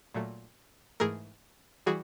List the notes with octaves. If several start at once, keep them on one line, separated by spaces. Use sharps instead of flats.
A#2 F#3 A3
G#2 E3 A3 G#4 A#4
E3 G3 F#4 G#4